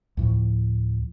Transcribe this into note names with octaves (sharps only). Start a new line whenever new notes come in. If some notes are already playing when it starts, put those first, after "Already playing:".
D2 A2 F3